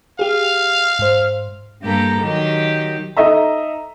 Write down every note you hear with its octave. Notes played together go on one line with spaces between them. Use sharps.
G4 G#4 F5
G#2 C5
G2 A#3 G4 A4 A#5
D#3 F#3 G4
D#4 A4 D#5 E5 A#5